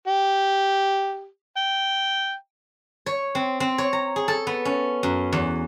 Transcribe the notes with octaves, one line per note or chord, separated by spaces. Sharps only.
G4
G5
C#5
C4
C4
C#5
A#5
G#4
A4
B3
C#4
F#2
E2